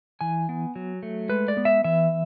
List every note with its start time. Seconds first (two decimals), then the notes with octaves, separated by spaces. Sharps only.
0.21 E3 G#5
0.49 B3
0.76 F#3
1.03 A3
1.29 G#3 B4
1.48 D5
1.57 B3
1.65 E5
1.84 E3 E5